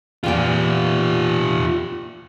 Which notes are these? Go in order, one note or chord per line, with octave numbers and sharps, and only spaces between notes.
E2 A#2 F4 G4 G5